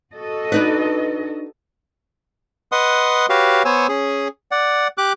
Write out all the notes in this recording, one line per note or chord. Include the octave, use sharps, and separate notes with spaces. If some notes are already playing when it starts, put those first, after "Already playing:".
F#4 A4 D#5
D4 D#4 B4
B4 D#5 F#5 C6 D#6
F#4 G4 B4 C#5 F5
B3 C5 C#5 G#5 E6
C#4 G#4
D5 F#5
G4 D6 F#6